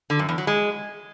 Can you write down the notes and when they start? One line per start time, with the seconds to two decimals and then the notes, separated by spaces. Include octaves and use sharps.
0.10 D3
0.19 F#2
0.29 E2
0.38 F#3
0.47 G#3